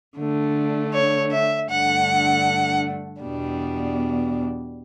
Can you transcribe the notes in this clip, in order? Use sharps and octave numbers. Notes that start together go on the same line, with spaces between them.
D3 A3 D4
C#5
E5
G2 D3 A3 D4 F#5
E2 B2 G3 D4